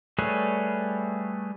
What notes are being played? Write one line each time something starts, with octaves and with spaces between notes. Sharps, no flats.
G3 A3 G#4 B4 C#5